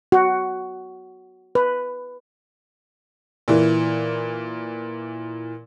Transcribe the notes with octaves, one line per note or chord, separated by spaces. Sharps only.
F#4
B4
A#2 E3